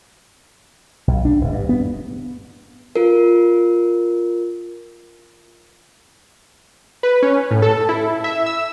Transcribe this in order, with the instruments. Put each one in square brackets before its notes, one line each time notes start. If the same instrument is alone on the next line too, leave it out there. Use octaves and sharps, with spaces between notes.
[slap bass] B1
D4
D1
G2
B3
[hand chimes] F4 A#4
[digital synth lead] B4
C#4
A2
A4
E4
E5
E6